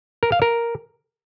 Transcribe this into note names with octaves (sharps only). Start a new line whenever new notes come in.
A#4
F5
A#4